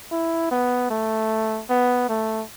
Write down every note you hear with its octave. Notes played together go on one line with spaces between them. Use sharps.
E4
B3
A3
B3
A3